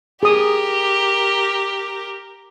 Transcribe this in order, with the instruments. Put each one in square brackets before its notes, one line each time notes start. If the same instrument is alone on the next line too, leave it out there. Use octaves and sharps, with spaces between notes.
[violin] G4 A#4 [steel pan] G#4 D#6